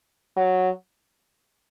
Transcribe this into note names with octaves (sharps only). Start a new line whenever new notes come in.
F#3